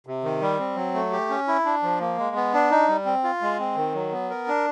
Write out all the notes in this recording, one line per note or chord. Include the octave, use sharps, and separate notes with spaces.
C3
D#3
G3
C4
F#3
A3
G4
C#4
E4
D4
F3
A#3
G#3
B3
D4
D#4
G3
C4
F4
G#3
C4
D#3
F#3
B3
A#4
D4